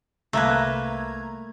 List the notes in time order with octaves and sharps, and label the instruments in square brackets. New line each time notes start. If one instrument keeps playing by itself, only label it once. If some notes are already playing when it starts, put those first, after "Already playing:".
[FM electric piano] C2 A#5 G#6 [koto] A3 A#3 B4